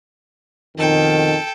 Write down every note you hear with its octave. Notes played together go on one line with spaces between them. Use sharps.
F2 B2 D#3 A4 G5